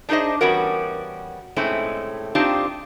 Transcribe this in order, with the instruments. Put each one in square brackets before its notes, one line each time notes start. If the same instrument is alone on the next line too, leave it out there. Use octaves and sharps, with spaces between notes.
[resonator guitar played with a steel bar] D4 D#4 G#4 A4 C5 D#5
E3 G3 B3 C#4 F#4 A#4
A2 G#3 A3 C4 C#4 D#4
C4 D4 D#4 F4 G4 C5